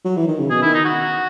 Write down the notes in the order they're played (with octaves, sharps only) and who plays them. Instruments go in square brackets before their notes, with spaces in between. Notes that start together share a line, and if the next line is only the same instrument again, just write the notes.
[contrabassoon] F#3
E3
D#3
C#3
[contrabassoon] B2 [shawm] G#4
[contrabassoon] D#3 [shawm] E4
[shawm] D#4
F#4